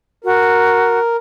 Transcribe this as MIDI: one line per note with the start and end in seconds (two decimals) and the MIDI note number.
0.24 0.99 66
0.24 1.17 70